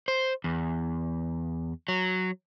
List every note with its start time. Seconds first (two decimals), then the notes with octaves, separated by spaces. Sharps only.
0.08 C5
0.44 E2
1.88 F#3